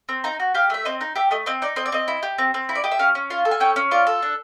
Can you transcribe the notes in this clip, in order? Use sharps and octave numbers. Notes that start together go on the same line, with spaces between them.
C4
D#4 A#5
F#4
G4 F5
A3 E5
C4 D#5
D#4
G4 E5
A3 D#5
C4 D#5
D#4 D5
C4 D#5
D5
C4 D#5
E4
G4
C4
C4
E4
D5
G4 D#5
E5
C#4 F5
C#4
F4 F5
A4
G#5
C#4 G5
C#4
F4 D5
A4
D4